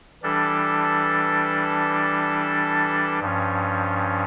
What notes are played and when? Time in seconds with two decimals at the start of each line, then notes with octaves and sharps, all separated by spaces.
0.23 E3 G3 D4 A4
3.20 G2 F3 C#4